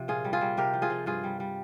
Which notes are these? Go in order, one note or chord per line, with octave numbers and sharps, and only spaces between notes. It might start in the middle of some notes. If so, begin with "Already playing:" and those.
Already playing: C3 F3
A#2 F4 G#4
G3
F4 G#4
G3
C3 G4 A#4
F3
F4 G#4
F3
G2 F4 G#4
G3
G3